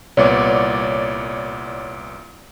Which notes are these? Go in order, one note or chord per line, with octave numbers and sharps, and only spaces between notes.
C2 A#2 B3 C#5 D5